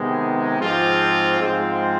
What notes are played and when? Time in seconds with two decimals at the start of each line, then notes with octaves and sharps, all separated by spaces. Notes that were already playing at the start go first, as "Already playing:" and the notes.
Already playing: C3 D#3 G#3 B3
0.59 G#2 F3 G#3 C4 F4
1.38 G#2 F3 G#3 C4 F4